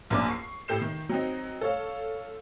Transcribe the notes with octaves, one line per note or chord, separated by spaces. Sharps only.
A#1 F#2 A#3 D4 D6
C#6 C7
A2 G4 A4 G6 C7 E7
D#3
F#3 C4 D#4
A4 C#5 F5